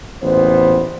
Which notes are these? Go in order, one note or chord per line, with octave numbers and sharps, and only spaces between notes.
A1 E2 A#2 B3 C5